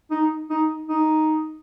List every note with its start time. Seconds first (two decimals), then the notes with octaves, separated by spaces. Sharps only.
0.11 D#4
0.50 D#4
0.88 D#4